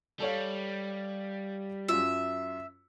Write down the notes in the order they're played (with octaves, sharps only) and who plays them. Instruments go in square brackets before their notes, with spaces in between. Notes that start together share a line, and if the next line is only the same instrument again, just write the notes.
[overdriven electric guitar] G3 [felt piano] A4 C#5 F5
[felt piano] F#2 F4 [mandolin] E5